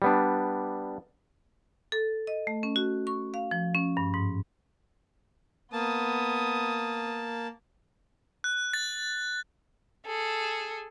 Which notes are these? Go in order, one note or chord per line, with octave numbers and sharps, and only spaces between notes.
G3 B3 D4
A4
D#5
A3
C#4
F#4
C#6
F5
F3
C#4
G2
G#2
A#3 B3 A5 D#6
F#6
A6
G#4 A4